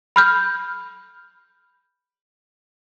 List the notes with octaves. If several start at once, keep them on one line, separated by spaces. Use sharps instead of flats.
B5 F6 G6